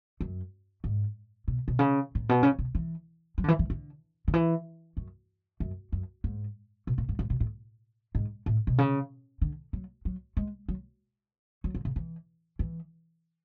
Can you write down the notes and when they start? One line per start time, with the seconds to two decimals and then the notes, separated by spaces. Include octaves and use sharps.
0.21 F#2
0.84 G#2
1.48 B2
1.68 B2
1.79 C#3
2.15 A2
2.29 B2
2.43 C#3
2.59 B2
2.75 E3
3.38 F#3
3.44 D3
3.48 E3
3.59 E3
3.70 D3
4.28 D3
4.34 E3
4.97 F#2
5.60 F#2
5.92 F#2
6.24 G#2
6.87 B2
6.98 A2
7.09 G#2
7.19 G#2
7.30 B2
7.40 A2
8.15 G#2
8.46 A2
8.67 B2
8.78 C#3
9.42 D3
9.73 F#3
10.05 F#3
10.37 G#3
10.69 F#3
11.64 F#3
11.75 D3
11.85 C#3
11.96 E3
12.59 E3